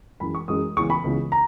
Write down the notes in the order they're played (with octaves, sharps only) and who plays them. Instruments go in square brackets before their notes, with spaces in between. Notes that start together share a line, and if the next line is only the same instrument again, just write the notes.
[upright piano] F#2 E3 G#3 B5
C#6
F#2 E3 G#3 D#6
C#2 C#3 E3 B3 C#6
B5
C#2 C#3 E3 B3
A#5